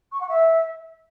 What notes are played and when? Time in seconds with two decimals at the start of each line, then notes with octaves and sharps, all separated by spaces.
0.12 C#6
0.20 F#5
0.29 E5